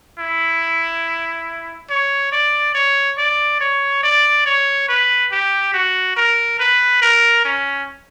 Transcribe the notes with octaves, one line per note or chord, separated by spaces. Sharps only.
E4
C#5
D5
C#5
D5
C#5
D5
C#5
B4
G4
F#4
A#4
B4
A#4
C#4